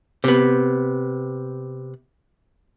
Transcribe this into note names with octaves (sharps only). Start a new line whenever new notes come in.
C3 B3